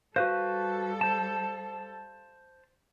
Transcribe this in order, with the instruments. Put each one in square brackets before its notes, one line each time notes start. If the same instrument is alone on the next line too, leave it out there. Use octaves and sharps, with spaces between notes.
[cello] G3 A4 [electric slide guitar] F#4 B4 C5 [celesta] F5
[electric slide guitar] C5 A5